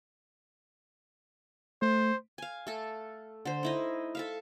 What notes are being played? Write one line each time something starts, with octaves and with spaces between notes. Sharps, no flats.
A3 C5
F5 G#5
A3 A4
D3 C5
D#4 E4 D#5
A4 E5 F5